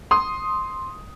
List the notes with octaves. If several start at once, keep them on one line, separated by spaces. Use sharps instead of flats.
C6 D#6